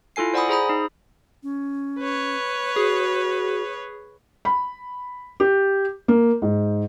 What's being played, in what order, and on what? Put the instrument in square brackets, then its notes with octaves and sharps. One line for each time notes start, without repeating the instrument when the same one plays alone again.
[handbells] E4 F4 A4 G#5 C7
C5 D5 F#5 G#5 B5 D#6
G#4 C5 A#5 B5 D#6
D#4
[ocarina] C#4
[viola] B4 C#5
[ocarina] F#4 [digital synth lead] G#4
[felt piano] B5
G4
A#3
G#2